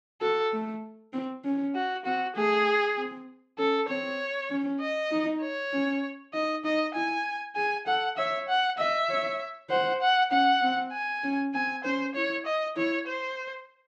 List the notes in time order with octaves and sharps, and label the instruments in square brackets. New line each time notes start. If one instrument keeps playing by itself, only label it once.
[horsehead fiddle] F#4 [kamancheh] A4
[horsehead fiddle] A3
C4
C#4
[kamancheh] F#4
[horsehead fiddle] C4 [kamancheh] F#4
[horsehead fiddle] A3 [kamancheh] G#4
[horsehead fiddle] C4
[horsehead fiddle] C#4 [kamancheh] A4
[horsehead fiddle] C4 [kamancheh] C#5
[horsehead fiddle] C#4
[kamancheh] D#5
[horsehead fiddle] D#4
[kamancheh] C#5
[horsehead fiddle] C#4
[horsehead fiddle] D#4 [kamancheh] D#5
[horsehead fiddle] D#4 [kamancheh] D#5
[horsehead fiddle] E4 [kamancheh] G#5
[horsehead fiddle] G#4 [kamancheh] G#5
[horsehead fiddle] A4 [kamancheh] F#5
[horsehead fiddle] C#5 [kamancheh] E5
[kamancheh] F#5
[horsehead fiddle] D#5 [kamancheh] E5
[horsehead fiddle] C#5
[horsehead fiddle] C5 [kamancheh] F#5
[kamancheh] F#5
[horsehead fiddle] C#4 [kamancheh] F#5
[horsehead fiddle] C4
[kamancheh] G#5
[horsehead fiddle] C#4
[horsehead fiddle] C4 [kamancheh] G#5
[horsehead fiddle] C#4 [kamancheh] C5
[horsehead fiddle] E4 [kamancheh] C#5
[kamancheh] D#5
[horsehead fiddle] E4 [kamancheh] C#5
[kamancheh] C5